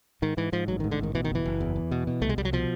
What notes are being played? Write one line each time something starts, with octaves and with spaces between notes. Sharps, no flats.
G#2 D#3
G#2 E3
G#2 F3
A1 F#3
G#2 D#3
D3
A1 D#3
B2 E3
D#3
F#1
E3
F#1
E2
E2
B2
B2
C2 A3
G#3
C2 G3
F#3
B2 F3